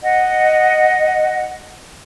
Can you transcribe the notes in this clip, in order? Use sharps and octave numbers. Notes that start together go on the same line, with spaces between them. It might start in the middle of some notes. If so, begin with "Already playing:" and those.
D#5 F#5